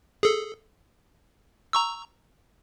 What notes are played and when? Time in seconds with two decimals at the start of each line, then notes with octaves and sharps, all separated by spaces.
0.23 G#4 A4
1.73 A#5 C#6 E6